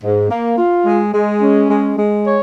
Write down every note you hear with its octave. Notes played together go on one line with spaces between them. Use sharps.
G#2
A#3
F4
G#3
G#3
C#4
G#3
G#3
C#5